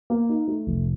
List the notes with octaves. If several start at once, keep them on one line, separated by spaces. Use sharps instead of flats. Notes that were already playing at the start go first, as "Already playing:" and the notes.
A#3
D#4
A3
F1